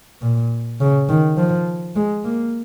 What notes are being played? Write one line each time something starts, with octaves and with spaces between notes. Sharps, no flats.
A#2
C#3
D#3
F3
G#3
A#3